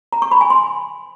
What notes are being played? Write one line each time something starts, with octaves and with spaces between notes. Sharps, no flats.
A#5
C#6
B5
G#5
C6